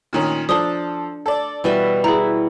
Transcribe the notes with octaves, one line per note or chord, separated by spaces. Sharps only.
A#2 D#3 C#4
F3 D4 A4 D#6 G7
A4 D5
B2 E3 G3 E5
E4 G#4 A#5